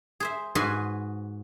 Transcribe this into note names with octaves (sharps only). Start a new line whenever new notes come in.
G#4 C5 E5
G#2 F#4 G#4 B4 G#5 C6